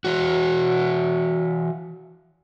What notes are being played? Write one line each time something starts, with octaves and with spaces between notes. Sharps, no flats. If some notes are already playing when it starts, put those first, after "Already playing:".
E3 F#4